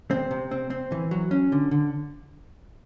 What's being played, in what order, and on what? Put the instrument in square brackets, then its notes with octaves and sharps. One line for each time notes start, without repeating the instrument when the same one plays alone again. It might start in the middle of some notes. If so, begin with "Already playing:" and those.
[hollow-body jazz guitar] C4
C3
C4
C4
E3
F#3
C#4
D3
D3